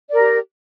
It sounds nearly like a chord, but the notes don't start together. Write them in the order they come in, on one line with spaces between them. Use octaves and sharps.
D5 A#4 G4